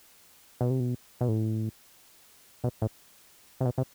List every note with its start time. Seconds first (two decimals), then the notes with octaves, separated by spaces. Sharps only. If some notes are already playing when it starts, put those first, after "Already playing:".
0.61 B2
0.70 C3
0.80 B2
1.21 B2
1.28 A2
2.64 B2
2.82 A2
3.61 C3
3.65 B2
3.78 C3